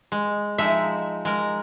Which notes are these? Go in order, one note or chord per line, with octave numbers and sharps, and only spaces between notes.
G#3
F3 G#3 D#4 E5
G#3 A#4